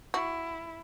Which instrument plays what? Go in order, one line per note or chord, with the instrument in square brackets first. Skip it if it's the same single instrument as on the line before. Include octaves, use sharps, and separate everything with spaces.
[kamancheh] E4 [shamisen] F#4